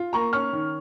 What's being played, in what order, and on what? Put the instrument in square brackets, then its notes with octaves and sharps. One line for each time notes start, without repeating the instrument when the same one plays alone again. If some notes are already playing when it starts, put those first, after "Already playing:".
Already playing: [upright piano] F4
A#3 A#5 C#6
C#4 C#6 F6
D#3